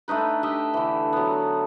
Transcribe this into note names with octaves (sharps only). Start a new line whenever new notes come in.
A3 D4 D#4 B4
G4 D#5 E5
D3 E3
F#3 B3